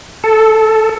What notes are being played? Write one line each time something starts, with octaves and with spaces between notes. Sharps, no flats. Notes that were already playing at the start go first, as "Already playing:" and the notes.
A4